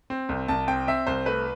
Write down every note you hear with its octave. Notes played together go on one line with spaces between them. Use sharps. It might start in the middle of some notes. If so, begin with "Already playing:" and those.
C4
C2
C2 A5
C4 G5
C4 E5
C2 C5
A3 B4